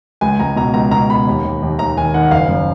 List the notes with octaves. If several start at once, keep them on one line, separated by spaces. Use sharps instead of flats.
C#2 G#5
C#2 A#5
B2 A#5
C#2 A#5
B2 A#5
B2 B5
D#2
D#2
D#2
D#2 A#5
D#3 G#5
D#3 F#5
F#1 F5
F#2